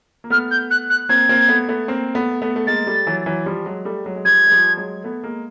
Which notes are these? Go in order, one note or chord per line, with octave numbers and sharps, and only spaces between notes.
A#3
A3 B3 F6
G6
F#6
F#6
A#3 C4 G#6
A#3 C4
A3 B3
A3 B3
A#3 C4
A3 B3
A3 B3
A3
G#3 A#3 A6
G3 A3
E3 F#3
E3 F#3
F3 G3
F#3 G#3
G3 A3
F#3 G#3
G#3
F3 G3 G#6
G#3
F3 G3
F#3 G#3
A3 B3
G#3 A#3